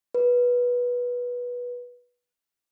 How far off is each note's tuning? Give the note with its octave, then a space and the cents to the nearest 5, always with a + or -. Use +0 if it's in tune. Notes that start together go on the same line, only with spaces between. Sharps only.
B4 -15